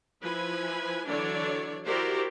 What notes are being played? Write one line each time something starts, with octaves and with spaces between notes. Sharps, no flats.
F3 E4 B4 G#5
D3 E3 F#3 D4 C#5 D5
E4 F#4 G4 A#4 C5 D5